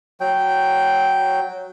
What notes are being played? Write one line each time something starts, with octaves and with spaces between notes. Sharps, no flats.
F#3 G5